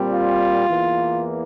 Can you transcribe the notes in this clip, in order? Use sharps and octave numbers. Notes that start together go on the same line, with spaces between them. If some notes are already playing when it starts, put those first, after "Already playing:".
Already playing: A#2 G3 C4
F4
E2 E3 A#3